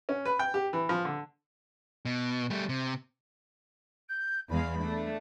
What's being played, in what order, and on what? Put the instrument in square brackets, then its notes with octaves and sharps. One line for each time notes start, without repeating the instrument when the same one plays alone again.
[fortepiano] C#4
B4
G5
G4
E3
F3
D3
[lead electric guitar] B2
G3 A3
C3
[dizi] G6
[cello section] E2 G#3 F5 [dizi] B5
[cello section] A3 D4